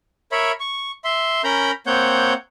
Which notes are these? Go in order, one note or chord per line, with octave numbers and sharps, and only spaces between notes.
A#4 C#5 E5 B5
C#6
E5 C6
C#4 A#4 A#5 B5 G6
A#3 C4 C#5 F#5 G6